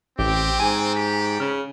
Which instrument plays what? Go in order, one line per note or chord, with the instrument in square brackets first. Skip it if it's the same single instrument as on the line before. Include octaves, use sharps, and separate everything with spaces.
[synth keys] A1 [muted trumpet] C4 [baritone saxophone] G4
[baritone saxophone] G#2 [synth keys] G#5
[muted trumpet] G4
[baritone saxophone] C#3 [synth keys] F6